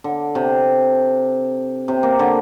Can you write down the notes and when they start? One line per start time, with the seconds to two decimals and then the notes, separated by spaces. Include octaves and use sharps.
0.04 D3
0.35 C3
1.88 C3
2.03 A#3
2.19 D3